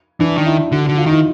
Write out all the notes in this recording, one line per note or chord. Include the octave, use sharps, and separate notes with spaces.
E3 D4
D#3
E4
D3 F#4
D3 F#4
F4
D#3 D#4 E4